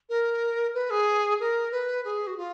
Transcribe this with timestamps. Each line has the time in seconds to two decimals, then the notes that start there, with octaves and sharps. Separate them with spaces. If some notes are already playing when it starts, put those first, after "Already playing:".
0.09 A#4
0.74 B4
0.90 G#4
1.39 A#4
1.71 B4
2.04 G#4
2.26 F#4
2.37 F4